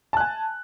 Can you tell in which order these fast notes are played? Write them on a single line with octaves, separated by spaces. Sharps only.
A5 F#6 G#5